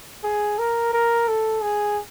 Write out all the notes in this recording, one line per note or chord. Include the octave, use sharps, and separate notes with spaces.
G#4
A#4
A#4
A4
G#4